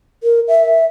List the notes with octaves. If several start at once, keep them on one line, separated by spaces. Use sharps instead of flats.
A#4
E5